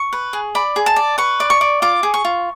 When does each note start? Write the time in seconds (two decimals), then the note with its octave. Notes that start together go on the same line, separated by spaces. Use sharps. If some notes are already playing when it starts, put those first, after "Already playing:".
Already playing: C#6
0.13 B4
0.33 G#4
0.55 D5 B5
0.76 G#4
0.86 A5
0.96 D5
1.18 B4 C#6
1.40 D5
1.50 C#6
1.61 D5
1.82 F4 D6
2.03 G#4
2.14 C#6
2.25 F4